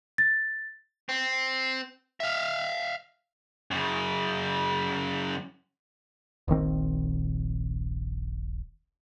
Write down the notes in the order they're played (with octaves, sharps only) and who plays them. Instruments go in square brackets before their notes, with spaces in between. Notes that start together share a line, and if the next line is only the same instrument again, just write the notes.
[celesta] A6
[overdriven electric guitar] C4
E5 F5
[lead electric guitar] F#2 C#3
[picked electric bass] D#1 A#1 D#3 C4